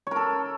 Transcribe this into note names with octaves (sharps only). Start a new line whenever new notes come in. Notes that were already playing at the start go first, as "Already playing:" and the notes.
A4 A#4 C#5